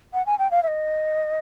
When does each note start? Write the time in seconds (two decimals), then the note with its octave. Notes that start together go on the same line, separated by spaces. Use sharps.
0.13 F#5
0.26 G#5
0.39 G5
0.51 F5
0.63 E5
0.68 D#5